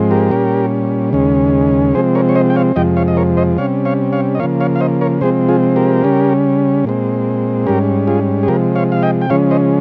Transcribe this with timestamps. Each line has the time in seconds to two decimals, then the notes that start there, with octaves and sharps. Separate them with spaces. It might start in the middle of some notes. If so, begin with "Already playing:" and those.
Already playing: G#2 F3 G#3 C4
0.11 G4 A#4
0.31 A#2 G3 C#4
1.13 D#2 C#3 G#3 C#4
1.94 C3 F3 G#3 C4 G#4 C5
2.15 A#4 C#5
2.29 C#5
2.35 C5 D#5
2.50 G5
2.56 C#5 F5
2.76 F2 C3 F3 G#3 D#5 G5
2.97 C#5 F5
3.08 D#5
3.17 A#4 C#5
3.37 C5 D#5
3.57 C3 G3 C#4 C#5 F5
3.85 C#5 F5
4.13 C#5 F5
4.35 D#5
4.39 C#3 F3 A#3 C#5 F5
4.60 C#5 F5
4.76 F5
4.80 C5 D#5
5.01 A#4 C#5
5.21 C3 F3 G#3 C4 G#4 C5
5.49 F4 G#4
5.76 G4 A#4
6.03 C#3 G3 C#4
6.84 A#2 G#3 C4
7.66 G#2 G3 C#4 G4 A#4
8.07 F4 G#4
8.43 G#4
8.48 C3 F3 G#3 G4 A#4
8.75 C#5 F5
8.92 F5
9.03 D#5 G5
9.21 G5
9.30 C#3 F3 G#3 C#4 C#5 F5
9.51 C5 D#5